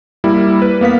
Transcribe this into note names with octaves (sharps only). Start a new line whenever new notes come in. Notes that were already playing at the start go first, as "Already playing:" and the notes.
G3 A#3 E4
B4
A#3 B3 F5 B6